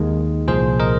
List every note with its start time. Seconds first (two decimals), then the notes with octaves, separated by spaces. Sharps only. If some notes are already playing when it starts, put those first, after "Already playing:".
Already playing: D#2 D#3 G#3 A#4 D#5
0.48 C2 A#2 F3 G#4 C5
0.80 A#4 D#5